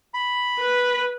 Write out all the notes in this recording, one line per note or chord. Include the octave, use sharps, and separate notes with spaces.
B5
B4